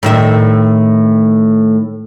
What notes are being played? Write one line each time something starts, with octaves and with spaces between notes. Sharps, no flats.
A2 D#3 E5